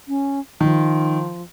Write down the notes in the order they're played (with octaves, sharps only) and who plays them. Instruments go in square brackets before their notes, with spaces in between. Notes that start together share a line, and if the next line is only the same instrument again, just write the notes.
[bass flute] C#4
[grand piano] D#3 [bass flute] F3